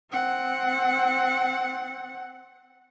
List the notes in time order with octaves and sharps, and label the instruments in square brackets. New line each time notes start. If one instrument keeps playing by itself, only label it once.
[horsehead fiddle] C4 F#5